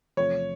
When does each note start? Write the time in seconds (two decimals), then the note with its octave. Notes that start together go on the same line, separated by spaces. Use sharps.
0.17 E2 C3 F3 A3 C4 C#5